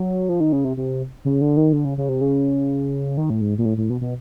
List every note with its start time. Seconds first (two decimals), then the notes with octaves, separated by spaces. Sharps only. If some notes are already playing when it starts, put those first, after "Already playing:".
Already playing: F#3
0.29 F3
0.40 D#3
0.52 C#3
0.65 C3
0.77 C3
1.25 C#3
1.41 D3
1.57 D#3
1.73 D3
1.85 C#3
1.98 C#3
2.09 C3
2.21 C#3
3.17 D#3
3.30 A2
3.41 G#2
3.58 A#2
3.65 A2
3.78 A2
3.90 B2
4.01 B2